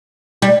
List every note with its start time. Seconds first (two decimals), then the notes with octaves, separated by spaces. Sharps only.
0.42 G3